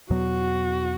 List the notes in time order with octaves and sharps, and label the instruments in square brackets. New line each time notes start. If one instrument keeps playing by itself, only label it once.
[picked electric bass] E2 B2 F#3 B3 [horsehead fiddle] F#4